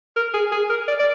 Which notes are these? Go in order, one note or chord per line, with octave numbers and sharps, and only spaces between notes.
A#4
G#4
G#4
A#4
D5
D5